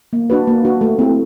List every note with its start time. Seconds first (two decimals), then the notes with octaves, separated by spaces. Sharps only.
0.13 A#3
0.30 D4 F#4 B4
0.47 A#3
0.65 D4 F#4 B4
0.81 A3
0.99 C4 E4 A4